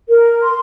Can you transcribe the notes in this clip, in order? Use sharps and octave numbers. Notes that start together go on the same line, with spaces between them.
A#4
C6